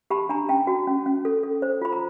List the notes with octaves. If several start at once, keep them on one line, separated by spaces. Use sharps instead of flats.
G4 A5 B5
D4 G#5 A#5
C#4 G5 A5
F#4
C#4
C#4
A4
A4
C5
F4 B5
A#5